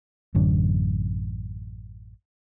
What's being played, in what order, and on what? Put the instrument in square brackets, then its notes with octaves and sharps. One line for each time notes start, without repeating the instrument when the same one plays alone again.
[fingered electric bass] A1 F#2 D3